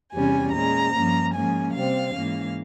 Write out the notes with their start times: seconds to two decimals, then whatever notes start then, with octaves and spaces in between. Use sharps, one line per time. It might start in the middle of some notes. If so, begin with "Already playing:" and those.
0.13 E2 C3 G3 C#4 G#5
0.53 A#2 G#3 C#4 A#5
0.93 G2 F3 A#3 C#4
1.34 G#2 F3 A#3 C#4 G#5
1.74 C3 G3 C4 F5
2.14 G#2 E3 A#3 C#4